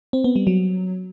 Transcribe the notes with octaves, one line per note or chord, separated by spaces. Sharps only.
C4
B3
G3
F#3